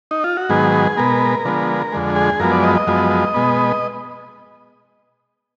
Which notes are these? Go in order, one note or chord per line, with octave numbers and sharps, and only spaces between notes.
D#4
F4
F#4
G#2 D#3 F#3 B3 G#4
B2 G#3 B3 A#4
D3 F3 G#3 B3
F2 D3 G#3
G#4
F#2 F3 G#3 B3 A#4
D5
D#5
D#5
F#2 F3 G#3 B3
B2 G#3 B3